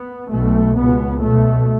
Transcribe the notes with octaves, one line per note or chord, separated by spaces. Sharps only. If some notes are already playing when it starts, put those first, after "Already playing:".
Already playing: B3
B1 B2 A3
C#2 B2 B3
B1 B2 A3